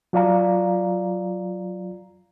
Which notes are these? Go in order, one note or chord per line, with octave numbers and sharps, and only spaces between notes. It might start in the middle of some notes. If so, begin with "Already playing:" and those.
F#3 F4 D5 F5 A#5